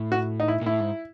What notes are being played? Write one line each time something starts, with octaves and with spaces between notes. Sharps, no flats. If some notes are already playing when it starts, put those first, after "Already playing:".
Already playing: A2
F#4
D#4
E4
A#2
A2 E4
G#2